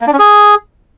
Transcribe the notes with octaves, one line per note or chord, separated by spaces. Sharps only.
A#3
D4
C#4
G#4